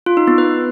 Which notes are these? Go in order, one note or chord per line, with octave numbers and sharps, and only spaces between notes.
F4
D#4
B3
B4